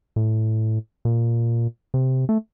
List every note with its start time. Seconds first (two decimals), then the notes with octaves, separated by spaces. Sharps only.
0.16 A2
1.05 A#2
1.94 C3
2.29 A3